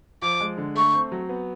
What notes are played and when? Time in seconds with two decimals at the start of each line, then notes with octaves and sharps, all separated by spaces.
0.22 F3 D6
0.40 G#3
0.58 D3
0.75 A3 C#6
0.94 C4
1.12 F#3
1.29 B3